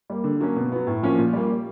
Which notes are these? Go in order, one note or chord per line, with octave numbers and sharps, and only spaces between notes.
G3 A#3
D3
F#3 A#3 C#4
B2
F#3 B3
A2
F3 A#3 C#4
A#2
G3 A#3